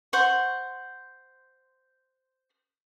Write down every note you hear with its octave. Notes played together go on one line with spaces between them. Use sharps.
C5 F#5 C6 C#6